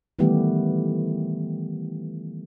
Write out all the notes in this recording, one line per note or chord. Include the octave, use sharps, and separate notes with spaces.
D#3 E3 G3 A3 B3 G4